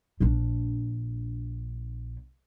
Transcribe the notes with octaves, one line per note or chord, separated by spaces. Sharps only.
A#1 D4